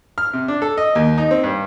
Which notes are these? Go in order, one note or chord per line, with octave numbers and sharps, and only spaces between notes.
F6
C3
D4
A4
D#5
D#2
D#4
C4
G2